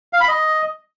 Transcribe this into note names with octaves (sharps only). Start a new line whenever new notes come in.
F5
B5
D#5